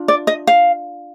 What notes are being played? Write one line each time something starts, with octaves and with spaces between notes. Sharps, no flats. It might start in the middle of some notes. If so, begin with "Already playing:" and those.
Already playing: D4 F4
D5
D#5
F5